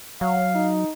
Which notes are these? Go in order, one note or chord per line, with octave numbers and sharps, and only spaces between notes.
F#3 F5
D#4